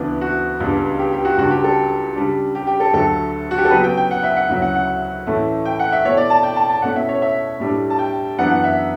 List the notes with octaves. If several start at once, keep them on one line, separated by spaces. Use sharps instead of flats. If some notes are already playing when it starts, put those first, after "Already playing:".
Already playing: D2 C#3 E3 B3 D4
F#4
C#2 C#3 G3 B3 D4
G4
G4
F#4
C#2 C#3 G3 D4 F#4
G4
A4
C#3 G3 D4
G4
G4
A4
D2 D3 F#3 A3 A4
F#4
G4
A4
C#3 F#3 B3 B4
G5
G5
F#5
E5
F#5
D2 C#3 F#3 C#4 E4
F#5
F#5
A2 E3 A3 C#4 E4
G5
F#5
E5
B2 A3 E4 C#5
D5
A5
G5
A5
A5
B2 A3 C#4 E4 F#5
E5
C#5
E5
A2 G3 D4
A5
G5
F#2 E3 B3 D4 F#5
F#5
E5